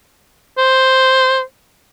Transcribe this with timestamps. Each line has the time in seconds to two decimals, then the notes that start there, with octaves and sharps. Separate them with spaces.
0.57 C5